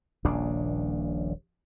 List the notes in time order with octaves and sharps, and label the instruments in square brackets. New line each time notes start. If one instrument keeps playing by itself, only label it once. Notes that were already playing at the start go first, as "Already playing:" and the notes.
[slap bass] D#1 A#1 C#3 D4